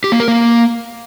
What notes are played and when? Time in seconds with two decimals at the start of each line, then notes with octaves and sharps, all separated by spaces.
0.04 G4
0.12 A#3
0.20 A#4
0.28 A#3